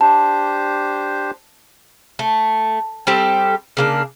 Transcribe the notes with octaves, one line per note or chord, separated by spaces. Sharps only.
D4 G4 C5 A5
A3
G3 C4 G4 A4
C#3 A#3 D4